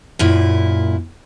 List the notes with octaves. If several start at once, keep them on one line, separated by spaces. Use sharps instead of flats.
F#2 A#2 E4